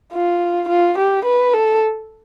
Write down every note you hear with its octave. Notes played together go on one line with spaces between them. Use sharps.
F4
F4
G4
B4
A4